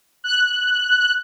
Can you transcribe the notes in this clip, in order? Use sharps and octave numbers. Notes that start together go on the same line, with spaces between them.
F#6